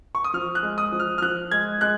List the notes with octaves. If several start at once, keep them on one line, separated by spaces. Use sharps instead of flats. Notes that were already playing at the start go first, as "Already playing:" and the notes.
C#6
D#6
F3 F6
F#6
G#3
D#6
F3
F6
F6
F3 F#6
G#3 G#6
G#3 F#6